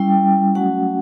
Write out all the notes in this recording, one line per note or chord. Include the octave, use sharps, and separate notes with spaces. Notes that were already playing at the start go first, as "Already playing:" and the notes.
Already playing: G3 C#4 E4 G5
F#3 A3 C#4 F#4 F#5